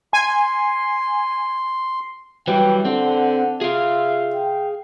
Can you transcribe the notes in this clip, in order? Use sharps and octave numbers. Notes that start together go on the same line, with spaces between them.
G#5 C6
E3 F#3 G3 G5
D3 C4 F#5
F4 G#4 E5 F5
G5